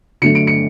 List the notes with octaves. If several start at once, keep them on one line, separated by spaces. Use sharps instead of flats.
D3 F#3 A3 C#7
D7
C#7